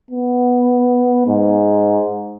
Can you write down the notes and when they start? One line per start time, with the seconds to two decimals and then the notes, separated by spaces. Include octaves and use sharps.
0.11 B3
1.27 G#2